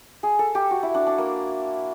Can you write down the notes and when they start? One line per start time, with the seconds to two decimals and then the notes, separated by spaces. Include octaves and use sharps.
0.23 G#4
0.39 A4
0.55 G4
0.71 F#4
0.83 E4
0.94 D4
1.07 D4
1.18 A#3